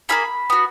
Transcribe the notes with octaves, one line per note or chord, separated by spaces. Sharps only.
A#3 F4 G#4 B5
B3 F#4